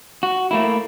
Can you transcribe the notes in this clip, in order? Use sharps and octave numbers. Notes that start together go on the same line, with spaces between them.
F#4
A3 A#3 E4